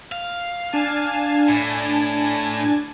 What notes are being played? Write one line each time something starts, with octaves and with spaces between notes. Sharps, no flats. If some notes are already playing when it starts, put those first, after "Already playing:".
F5
D4 G#5 A5
A2